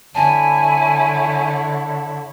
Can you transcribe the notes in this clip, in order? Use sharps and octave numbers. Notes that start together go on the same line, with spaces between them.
D3 E4 C#5 G#5 A5